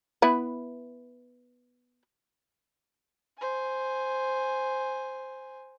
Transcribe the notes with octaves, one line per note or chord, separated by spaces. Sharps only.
B3 E4 B4
C5 G#5